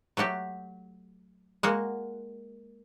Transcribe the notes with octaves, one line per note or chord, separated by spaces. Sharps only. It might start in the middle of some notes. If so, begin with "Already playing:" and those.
F#3 A3 F#4 G4
G#3 A#3 F#4